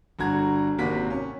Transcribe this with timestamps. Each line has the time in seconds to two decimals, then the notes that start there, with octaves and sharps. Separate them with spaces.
0.19 G1 D3 F#4 A#5 G#6
0.78 G#1 C3 A#3 F#4 B6
1.10 C#4